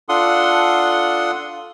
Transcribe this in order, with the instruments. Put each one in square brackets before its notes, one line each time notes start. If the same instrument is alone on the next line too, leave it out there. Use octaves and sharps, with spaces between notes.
[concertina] D4 F4 A4 F#5 C6 D#6